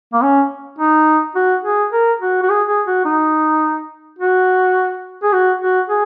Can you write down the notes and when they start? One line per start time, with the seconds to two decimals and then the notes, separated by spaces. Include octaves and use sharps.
0.13 A#3
0.22 C#4
0.79 D#4
1.36 F#4
1.65 G#4
1.92 A#4
2.21 F#4
2.43 F#4
2.50 G#4
2.68 G#4
2.87 F#4
3.05 D#4
4.19 F#4
5.23 G#4
5.33 F#4
5.61 F#4
5.89 G#4